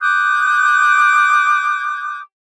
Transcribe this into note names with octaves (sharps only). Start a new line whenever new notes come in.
D6 D#6 F#6 G6